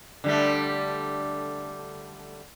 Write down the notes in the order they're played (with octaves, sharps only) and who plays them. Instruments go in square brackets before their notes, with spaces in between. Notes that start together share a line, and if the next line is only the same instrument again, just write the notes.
[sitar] D3 G3 A3